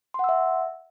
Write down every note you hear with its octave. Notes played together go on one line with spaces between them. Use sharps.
E5 F#5 C6 E6